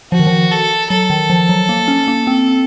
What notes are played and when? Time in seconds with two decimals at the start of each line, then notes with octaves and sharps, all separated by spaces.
0.12 F3 F#4
0.19 D#3
0.27 F3
0.51 A4
0.90 F#3 A4
1.10 D#3
1.30 F3
1.49 F#3
1.69 A#3
1.88 C#4
2.08 A#3
2.27 C4